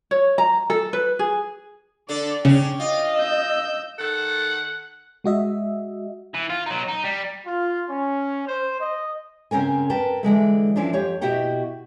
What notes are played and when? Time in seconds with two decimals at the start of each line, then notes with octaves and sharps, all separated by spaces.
0.11 C#5
0.38 A#5
0.70 A4
0.93 B4
1.19 G#4
2.09 D3 D4 A4 D5
2.45 C#3 C#4 D4 G5
2.80 F4 D#5
3.16 E6 G6
3.99 D#3 A4 F#5
5.24 G#3 F#4 D#5 E5
6.34 E3
6.50 F4
6.66 F#3 D#4
6.88 D#4
7.04 G3
7.44 F4
7.88 C#4
8.46 C5
8.79 D#5
9.51 C#3 C4 C#4 A#4 G#5
9.90 A#4 B4 G5 A5
10.23 D3 E3 G#3 A3
10.76 E3 F3 C#4 D4
10.93 F2 G4 C#5
11.21 B2 E4 F#4 G4 F#5 G5